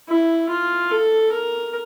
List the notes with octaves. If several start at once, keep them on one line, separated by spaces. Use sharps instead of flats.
E4
F4
A4
A#4